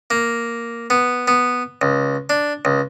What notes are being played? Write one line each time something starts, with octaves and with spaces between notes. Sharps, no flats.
A#3
B3
B3
C#2
D4
C#2